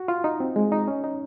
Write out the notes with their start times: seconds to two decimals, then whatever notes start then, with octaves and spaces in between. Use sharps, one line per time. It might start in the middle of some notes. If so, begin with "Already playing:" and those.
Already playing: F#4
0.08 F4
0.24 D#4
0.40 C4
0.56 G#3
0.72 D#4
0.88 C#4
1.04 D#4